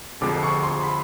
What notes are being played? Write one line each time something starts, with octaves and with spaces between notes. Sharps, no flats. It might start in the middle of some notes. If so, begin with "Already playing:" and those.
F1 F2 D3 F3 G#3 D6
C#6
C6
B5